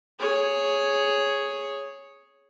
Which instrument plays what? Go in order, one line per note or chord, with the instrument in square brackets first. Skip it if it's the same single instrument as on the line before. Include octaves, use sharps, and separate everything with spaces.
[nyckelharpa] G#4 C#5